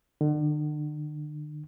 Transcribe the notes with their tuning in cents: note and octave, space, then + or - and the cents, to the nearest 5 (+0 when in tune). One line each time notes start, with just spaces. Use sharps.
D3 +40